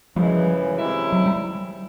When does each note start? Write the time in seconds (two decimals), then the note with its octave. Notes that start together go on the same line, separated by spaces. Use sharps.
0.16 F#2 C#3 E3 F3 G3 G#3
0.77 C3 D#3 G#3 C#4 E4
1.12 F#3
1.26 G3